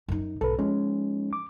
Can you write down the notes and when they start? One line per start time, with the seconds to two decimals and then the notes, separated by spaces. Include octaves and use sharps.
0.08 F#2 D#4
0.41 B1 G#2 A4 B4
0.59 F3 G#3 C#4 D#4
1.33 D6